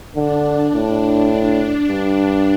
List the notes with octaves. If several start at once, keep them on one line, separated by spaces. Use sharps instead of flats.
D3 D4
A2 D4
D4
G2